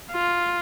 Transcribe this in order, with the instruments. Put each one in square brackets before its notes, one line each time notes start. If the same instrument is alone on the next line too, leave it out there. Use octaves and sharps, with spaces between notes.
[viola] F4